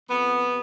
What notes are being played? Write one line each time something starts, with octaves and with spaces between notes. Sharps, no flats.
F2 B3
C3